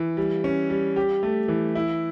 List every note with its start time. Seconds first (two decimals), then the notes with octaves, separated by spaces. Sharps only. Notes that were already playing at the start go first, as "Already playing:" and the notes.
Already playing: E3
0.17 G3
0.44 C#4
0.70 G3
0.96 G4
1.23 A3
1.48 E3
1.75 E4